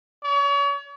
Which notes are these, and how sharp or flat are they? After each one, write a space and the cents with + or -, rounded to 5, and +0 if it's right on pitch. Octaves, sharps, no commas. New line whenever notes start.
C#5 +35